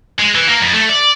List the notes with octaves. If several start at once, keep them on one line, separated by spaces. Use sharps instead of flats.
G#3
E3
A#3
F2
A3
D5